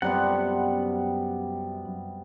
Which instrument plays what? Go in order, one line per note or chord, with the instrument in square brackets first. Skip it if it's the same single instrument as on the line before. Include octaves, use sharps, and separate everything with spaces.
[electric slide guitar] F#2 F#5 [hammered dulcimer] C3 G3 B3